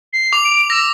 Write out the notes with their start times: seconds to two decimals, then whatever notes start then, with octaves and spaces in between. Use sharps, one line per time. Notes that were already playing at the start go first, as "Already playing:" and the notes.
0.13 C7
0.33 D6 F7
0.44 D7
0.70 E6 A#6